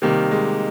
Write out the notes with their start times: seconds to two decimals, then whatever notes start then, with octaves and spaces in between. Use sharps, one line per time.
0.02 C3 D#3 G3 A#3
0.31 G#3